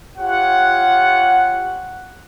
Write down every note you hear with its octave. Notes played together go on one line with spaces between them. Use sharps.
F4 G4 C#5 F#5